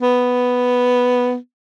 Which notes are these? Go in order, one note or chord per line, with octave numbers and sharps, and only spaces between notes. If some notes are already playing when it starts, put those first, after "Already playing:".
B3